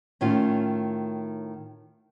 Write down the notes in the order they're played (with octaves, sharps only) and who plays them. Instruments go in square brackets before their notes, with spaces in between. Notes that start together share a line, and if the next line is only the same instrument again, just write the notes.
[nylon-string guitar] A2 D#3 C#4 F4